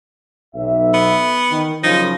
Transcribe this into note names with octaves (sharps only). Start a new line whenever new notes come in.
B1 E5
B3
D#3
F#2 C#3 F3 D#4